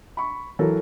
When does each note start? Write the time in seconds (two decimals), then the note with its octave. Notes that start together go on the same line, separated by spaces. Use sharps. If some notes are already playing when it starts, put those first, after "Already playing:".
0.17 B5 C#6
0.59 E3 F#3 A4 A#4